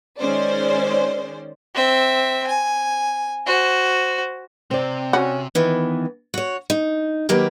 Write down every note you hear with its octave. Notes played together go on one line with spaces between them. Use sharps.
D#3 G#3 C#4 C5 D5
C4 E5
G#5
F#4 C5
C3 C4 D5
C#4 F#4
D#3 E3 B3
F#4 C#5
D#4
D#3 F#3 A#3 G4 A#4 B4